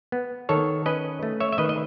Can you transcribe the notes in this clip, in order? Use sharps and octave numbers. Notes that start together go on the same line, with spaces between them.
B3
D#3 A4 C#5
C#4 B4 D#5
A3
C#5 E5
E5
D#3 B4 D#5
D#5